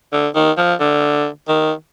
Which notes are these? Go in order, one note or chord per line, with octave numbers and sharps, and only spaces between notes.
D3
D#3
F3
D3
D#3